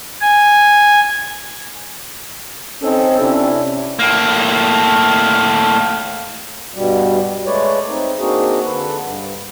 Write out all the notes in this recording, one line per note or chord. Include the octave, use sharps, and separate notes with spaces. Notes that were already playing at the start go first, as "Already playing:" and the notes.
G#5
C4 C#4 D#4 A4
C3 C#4 D4 E4
A2 A#3
G2 B2 G3
G#3 A3 B4 C#5 D5
C4 D#4
A#3 C4 D4 D#4 F#4 G#4
D3 A4 B4
G2